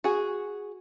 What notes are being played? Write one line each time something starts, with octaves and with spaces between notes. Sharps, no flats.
F#4 G#4